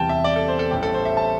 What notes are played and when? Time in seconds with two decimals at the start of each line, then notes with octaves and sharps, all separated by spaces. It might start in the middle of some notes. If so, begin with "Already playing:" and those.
Already playing: E2 C3 E3 G3 G5 A5
0.09 E5
0.24 D5
0.36 A4
0.48 C5
0.59 A4
0.71 A1 A2 G3 G4
0.83 A4
0.94 C5
1.05 E5
1.17 A5